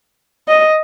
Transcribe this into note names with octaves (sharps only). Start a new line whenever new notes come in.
D#5